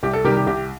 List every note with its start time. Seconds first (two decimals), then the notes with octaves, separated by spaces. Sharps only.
0.03 C2 G4
0.13 A4
0.24 C3 D#3 G3 G4 A#4
0.37 G4
0.47 C2 G4